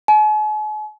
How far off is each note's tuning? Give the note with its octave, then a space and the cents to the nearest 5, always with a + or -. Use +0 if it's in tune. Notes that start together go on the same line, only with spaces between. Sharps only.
G#5 +45